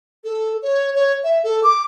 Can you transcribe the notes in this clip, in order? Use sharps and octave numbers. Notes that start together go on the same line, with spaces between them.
A4
C#5
C#5
E5
A4
D6